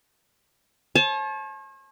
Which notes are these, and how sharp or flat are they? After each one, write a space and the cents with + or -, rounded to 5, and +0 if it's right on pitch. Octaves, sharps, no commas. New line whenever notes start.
C#5 -45 A5 -35